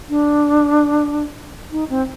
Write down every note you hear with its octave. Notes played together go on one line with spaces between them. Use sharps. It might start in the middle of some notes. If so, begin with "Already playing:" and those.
D4
D#4
C4